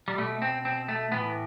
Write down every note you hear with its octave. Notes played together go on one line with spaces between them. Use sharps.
G3
B2 A3
C4
C4
A3
A2 E3 B3